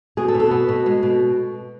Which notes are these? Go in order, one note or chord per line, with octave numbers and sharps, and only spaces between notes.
B2 G#4
A4
B2
A4
B3
B2
G#3
B2